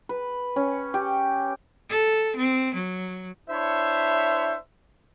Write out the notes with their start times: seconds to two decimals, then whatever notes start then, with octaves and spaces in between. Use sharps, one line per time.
0.09 B4
0.56 C#4
0.94 G4
1.90 A4
2.36 C4
2.74 F#3
3.49 D4 E4 C5 C#5 E5